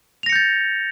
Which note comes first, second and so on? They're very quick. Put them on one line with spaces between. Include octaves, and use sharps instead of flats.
F7 A#6 C#7 G6 A6